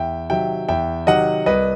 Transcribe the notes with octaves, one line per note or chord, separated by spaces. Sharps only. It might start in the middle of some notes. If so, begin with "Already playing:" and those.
Already playing: E2 E5 G5
C3 D#3 F#3 E5 G5
E2 E5 G5
C3 D#3 F#3 D#5 F#5
C2 B4 D#5